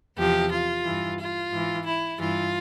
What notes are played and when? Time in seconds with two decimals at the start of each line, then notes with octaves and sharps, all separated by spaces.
0.17 E2 C3 F3 G4
0.51 F4
0.84 G2 E3
1.18 F4
1.52 G#2 E3
1.85 E4
2.19 G2 E3 F4